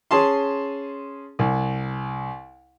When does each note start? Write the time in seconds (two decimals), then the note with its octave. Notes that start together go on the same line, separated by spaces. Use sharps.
0.11 C#4 G#4 A5 C6
1.39 C2